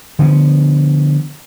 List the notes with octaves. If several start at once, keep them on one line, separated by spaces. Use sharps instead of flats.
D3 F3 A#3 B3